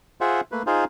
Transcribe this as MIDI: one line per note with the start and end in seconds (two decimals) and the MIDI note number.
0.21 0.41 65
0.21 0.41 68
0.21 0.41 72
0.21 0.41 76
0.21 0.41 78
0.52 0.63 57
0.52 0.63 58
0.52 0.63 71
0.67 0.85 63
0.67 0.85 65
0.67 0.85 68
0.67 0.85 72
0.67 0.85 77